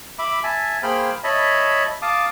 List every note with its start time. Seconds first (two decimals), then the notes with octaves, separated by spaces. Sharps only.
0.19 E5 B5 D6
0.44 E5 G#5 A5
0.83 A#3 G#4 C5 G5 B5 F6
1.24 C#5 D#5 E5 A5 B5
2.02 F5 A5 D6 D#6